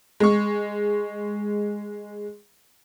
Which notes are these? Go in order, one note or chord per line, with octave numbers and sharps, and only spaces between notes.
G#3 C#6